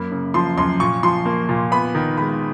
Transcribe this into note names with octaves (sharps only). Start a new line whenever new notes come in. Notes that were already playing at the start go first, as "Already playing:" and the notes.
Already playing: F#2 A#3 B5
C#3
F3 C6
F#2 C6
A#2 C#6
F3 C6
A#3
A#2
B3 B5
D#3
G#3 B5